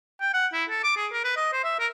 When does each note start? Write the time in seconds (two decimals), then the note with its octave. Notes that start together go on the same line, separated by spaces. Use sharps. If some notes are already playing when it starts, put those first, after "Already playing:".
0.21 G5
0.34 F#5
0.53 E4
0.69 A4
0.84 D6
0.97 G#4
1.12 A#4
1.24 B4
1.37 D#5
1.53 C5
1.64 E5
1.79 A#4